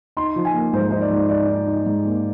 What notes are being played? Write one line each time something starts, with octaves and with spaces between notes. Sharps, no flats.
D#4 C6
F3
G#5
A#3
G#2 C5
D#4 C5
D5
G#2
D#4 D5
D#4
D#4
G#2
A#3